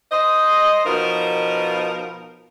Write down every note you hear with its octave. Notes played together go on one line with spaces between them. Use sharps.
C5 D#5
B2 F3 D#4 A#4